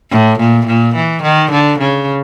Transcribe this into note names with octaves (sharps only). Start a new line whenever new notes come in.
A2
A#2
A#2
E3
D#3
D3
C#3